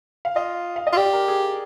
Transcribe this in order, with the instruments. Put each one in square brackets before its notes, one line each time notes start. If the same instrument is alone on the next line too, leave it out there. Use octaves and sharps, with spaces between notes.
[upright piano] F5
[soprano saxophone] F4 [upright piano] D#5
[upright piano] F5
D#5
[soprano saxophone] F4
[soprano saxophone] G4 [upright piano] D5
[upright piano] A#4
G#4